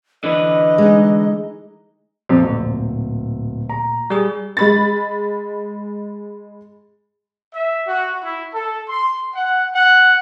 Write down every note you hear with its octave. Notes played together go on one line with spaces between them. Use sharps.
D3 E3 B4 D#5
G#3 D#4
F2 A#2
D1
A#5
G3 G#4
G#3 B5 A6
E5
F#4
E4
A4
C6
F#5
F#5